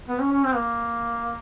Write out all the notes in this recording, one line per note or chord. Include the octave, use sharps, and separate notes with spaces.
B3
C#4
C#4
C4
A#3